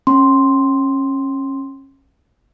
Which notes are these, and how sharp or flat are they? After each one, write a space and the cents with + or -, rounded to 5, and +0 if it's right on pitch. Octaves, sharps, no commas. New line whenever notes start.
C#4 -25 C6 +0